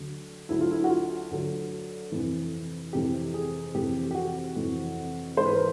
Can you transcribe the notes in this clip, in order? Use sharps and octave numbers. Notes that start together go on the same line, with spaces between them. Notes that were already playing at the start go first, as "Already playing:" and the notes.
Already playing: D2 D3 F#3
D2 D3 F#3 E4
F4
E4
F#4
F4
D2 D3 F#3
F2 C3 E3
F2 C3 E3 G4
G#4
F2 C3 E3 G4
G4
F#4
F2 C3 E3
G#2 E3 C5
B4
A#4